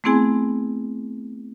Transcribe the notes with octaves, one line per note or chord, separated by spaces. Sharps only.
A3 B3 C4 E4 G#4 G#5